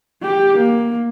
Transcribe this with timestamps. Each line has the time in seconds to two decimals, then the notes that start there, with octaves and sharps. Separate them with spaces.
0.23 G4
0.58 A#3